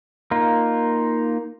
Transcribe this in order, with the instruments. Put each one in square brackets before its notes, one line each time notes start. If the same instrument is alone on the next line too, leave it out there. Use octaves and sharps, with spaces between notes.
[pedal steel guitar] A#3 D#4 F4